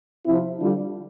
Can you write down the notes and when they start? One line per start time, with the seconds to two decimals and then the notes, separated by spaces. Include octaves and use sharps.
0.25 C3 F3 C4 E4
0.58 D3 G3 D4 F4